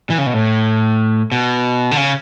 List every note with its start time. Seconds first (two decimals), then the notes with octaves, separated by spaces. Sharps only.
0.10 E3
0.18 C#3
0.26 B2
0.34 A2
1.32 B2
1.91 D3
1.97 C#3